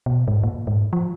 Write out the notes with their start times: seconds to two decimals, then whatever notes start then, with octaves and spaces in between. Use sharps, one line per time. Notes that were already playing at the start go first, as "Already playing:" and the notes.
0.06 B2
0.28 G#2
0.43 A#2
0.67 G#2
0.93 F3